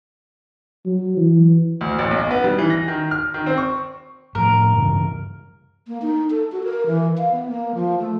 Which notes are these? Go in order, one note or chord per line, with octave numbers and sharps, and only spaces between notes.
F#3
E3
D2
A1
B1
B3
G3
E3
A#6
D#3
F6
D#3
C4
C#6
A2 F3 A#4
G2 C#3 E3
A#3
D#4
A4
F#4
A#4
E3
F5
B3
A#3
F3
A3